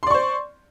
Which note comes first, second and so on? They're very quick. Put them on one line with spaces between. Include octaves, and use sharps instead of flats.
C6 D5 C#6 C5